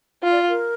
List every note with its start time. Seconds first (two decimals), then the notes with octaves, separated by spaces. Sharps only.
0.23 F4
0.32 D5
0.49 A#4